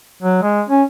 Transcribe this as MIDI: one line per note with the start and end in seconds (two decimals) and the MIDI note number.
0.23 0.41 54
0.43 0.62 56
0.69 0.83 61